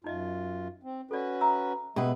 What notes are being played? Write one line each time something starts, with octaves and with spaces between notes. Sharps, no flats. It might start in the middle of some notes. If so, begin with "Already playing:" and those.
F#2 D#4 F4 D#5 E5
C4
C#4 F#4 A4 B4 D5
E5 A#5 E6
B2 G#3 G4 B4 E5 G5 D#6